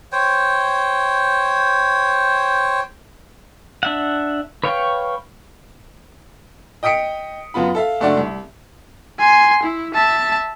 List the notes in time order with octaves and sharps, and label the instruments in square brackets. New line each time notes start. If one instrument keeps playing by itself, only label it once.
[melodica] C5 C#5 G5
[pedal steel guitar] D4 E5 F#5
B4 C#5 F5 G5 C#6
[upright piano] D#5 G5 D#6 B6 C#7 D7
F#2 B3 F4 B5
A4 E5 F5
F#1 A3 D4 F#4 D5 E5
C2
[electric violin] G#5 C6
E4
E5 A5